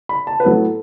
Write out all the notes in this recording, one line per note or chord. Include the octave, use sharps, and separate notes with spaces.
B5
A5
B4
A2 F#3 B3 A4